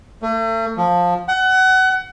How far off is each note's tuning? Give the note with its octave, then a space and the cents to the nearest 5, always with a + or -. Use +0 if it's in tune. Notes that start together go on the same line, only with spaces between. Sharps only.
A3 +40
F3 +15
F#5 +25